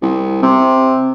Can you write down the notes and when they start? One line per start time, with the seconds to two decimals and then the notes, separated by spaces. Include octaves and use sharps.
0.02 C2
0.42 C3